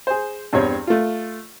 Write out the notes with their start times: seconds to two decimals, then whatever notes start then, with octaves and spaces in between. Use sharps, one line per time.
0.07 G#4 C5
0.53 E2 G2 C4 C#5
0.87 A3 F4